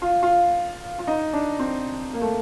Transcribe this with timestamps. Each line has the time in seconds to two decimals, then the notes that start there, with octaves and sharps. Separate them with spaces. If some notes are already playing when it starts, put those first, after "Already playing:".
0.02 F4
0.23 F4
0.99 F4
1.07 D#4
1.33 D4
1.59 C4
2.13 A#3
2.21 A3